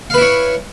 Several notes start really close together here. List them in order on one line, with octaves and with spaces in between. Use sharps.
F5 B4 E4 C#5